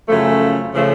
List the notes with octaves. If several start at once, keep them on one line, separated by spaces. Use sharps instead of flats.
F#2 C#3 F3 A3
C#3 F3 A3